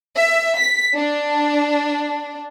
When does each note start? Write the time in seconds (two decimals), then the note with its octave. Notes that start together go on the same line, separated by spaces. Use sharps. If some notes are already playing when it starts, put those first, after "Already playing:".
0.16 E5
0.59 B6
0.95 D4